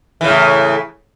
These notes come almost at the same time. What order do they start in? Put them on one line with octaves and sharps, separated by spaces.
E3 C#3 A2